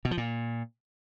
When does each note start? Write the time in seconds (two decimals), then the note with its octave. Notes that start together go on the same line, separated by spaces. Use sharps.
0.05 B2
0.11 F3
0.18 A#2